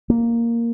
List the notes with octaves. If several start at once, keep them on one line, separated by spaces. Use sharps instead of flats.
A#3